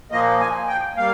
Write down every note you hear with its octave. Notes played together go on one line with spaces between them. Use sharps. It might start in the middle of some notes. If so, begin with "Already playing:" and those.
A#2 F3 A#3 D#5
G#5
G5
G3 A#3 F5